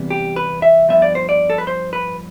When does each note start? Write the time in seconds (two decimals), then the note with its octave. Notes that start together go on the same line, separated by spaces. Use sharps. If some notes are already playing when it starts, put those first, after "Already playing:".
Already playing: E2 C3 G3 B3
0.11 G4
0.36 B4
0.62 E5
0.89 G2 F3 B3 E5
1.02 D5
1.15 C5
1.29 D5
1.50 A4
1.58 B4
1.67 C5
1.93 B4